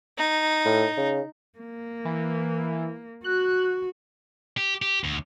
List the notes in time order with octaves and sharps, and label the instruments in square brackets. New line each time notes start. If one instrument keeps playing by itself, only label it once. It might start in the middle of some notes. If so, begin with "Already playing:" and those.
[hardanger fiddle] D#4
[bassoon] A2
C#3
[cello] A#3
[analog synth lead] E3
[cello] F#4 [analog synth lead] F#6
[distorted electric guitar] G4
G4
D2